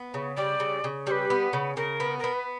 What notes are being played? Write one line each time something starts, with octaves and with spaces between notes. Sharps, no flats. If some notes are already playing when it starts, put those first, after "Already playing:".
Already playing: B3
C#3
G3 D5
C#3
C#3
G3 B4 C#5
B3
C#3
C#3 A#4
B3
B3 A#4
B4